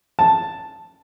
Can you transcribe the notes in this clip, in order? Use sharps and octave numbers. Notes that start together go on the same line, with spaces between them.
A5